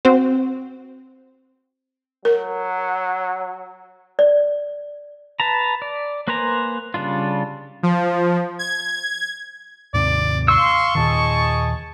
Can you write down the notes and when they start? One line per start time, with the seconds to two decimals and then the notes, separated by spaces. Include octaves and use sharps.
0.05 C4 F#4 C5
2.25 F#3 A#4
4.19 D5
5.40 B4 A5 A#5
5.82 D5
6.28 A#3 B4 C5 G#5 A#5
6.94 C#3 G3 D4 F4
7.83 F3
8.59 G#6
9.94 D#2 G#2 C3 D5
10.48 F5 C6 C#6 E6
10.95 D#2 A#2 D#3 G#4 D#5 A5